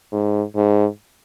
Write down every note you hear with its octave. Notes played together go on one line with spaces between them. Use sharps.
G#2
G#2